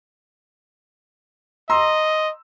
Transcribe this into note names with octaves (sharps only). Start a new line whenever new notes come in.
D#5 A#5 C6 E6